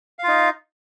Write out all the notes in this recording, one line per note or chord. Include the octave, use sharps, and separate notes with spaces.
D#4 F4 F5